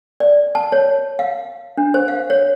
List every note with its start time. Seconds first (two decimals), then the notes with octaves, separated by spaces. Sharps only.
0.20 D5
0.55 A5
0.72 C#5
1.19 F5
1.78 D4
1.94 C5
2.08 F5
2.30 C#5